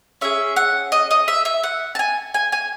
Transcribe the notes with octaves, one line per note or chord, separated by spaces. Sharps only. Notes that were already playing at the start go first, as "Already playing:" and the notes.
C#4 G#4 E5
F#5
D#5
D#5
E5
E5
F#5
A5
G#5
G#5
G#5